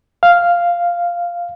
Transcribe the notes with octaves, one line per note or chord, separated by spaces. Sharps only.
F5